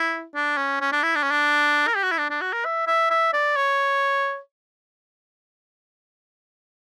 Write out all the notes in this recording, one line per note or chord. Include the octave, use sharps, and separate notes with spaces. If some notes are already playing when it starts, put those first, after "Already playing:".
Already playing: E4
D4
C#4
C#4
D4
E4
D4
C#4
D4
A#4
G4
F#4
E4
D4
D4
F#4
A#4
E5
E5
E5
D5
C#5